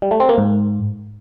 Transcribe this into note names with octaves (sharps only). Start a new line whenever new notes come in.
G3
A3
C4
A#3
G#2